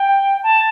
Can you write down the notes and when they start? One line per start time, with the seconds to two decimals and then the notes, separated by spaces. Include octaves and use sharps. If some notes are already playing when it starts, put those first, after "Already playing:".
Already playing: G5
0.43 A5